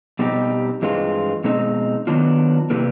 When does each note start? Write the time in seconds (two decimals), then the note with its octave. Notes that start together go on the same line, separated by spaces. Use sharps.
0.19 B2 G3 C4 D#4 G4
0.82 G2 E3 G#3 C4 F4
1.44 B2 G#3 C4 D#4
2.07 D#3 F#3 B3 D4 F4
2.70 C3 E3 G3 A#3